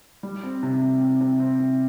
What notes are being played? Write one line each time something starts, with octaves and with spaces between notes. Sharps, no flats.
G3
C4
C3
C3
C3
C3
C4
C3